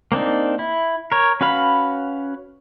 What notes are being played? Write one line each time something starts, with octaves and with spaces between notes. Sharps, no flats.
A#3 C4 D4 D#4
E4
A#4 C#5
C#4 F#4 B4 F5 B5